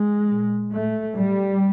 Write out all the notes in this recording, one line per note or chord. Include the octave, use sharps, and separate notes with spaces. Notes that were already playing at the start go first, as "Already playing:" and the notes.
Already playing: G#3
A#2
A2 A3
A2 G3